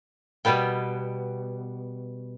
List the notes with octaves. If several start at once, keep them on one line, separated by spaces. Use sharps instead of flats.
B2 G3 B3 G5